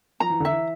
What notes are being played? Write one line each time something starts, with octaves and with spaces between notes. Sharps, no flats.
F3 A#5
E3
D3 E5
E3